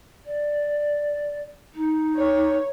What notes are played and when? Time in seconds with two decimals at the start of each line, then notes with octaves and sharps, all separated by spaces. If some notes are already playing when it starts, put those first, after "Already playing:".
0.25 D5
1.74 D#4
2.15 C#5